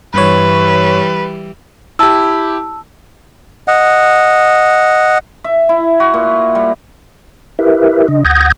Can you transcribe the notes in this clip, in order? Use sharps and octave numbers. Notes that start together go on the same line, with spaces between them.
G2 E3 G3 B4 C#5
E4 G4 A5 E6
D#5 F#5
E5
E4
F#4
A#2
G3
E4 G4 A#4 B4 E5
C#3 D4 D#5
D2 F#5 D#6 G6 G#6 A#6